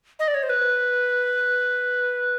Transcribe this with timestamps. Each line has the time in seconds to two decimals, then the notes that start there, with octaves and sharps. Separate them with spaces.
0.19 D#5
0.28 D5
0.34 C#5
0.43 C5
0.49 B4